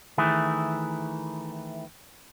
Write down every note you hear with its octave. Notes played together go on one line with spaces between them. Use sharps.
D#3 E3 A3 E4 G#4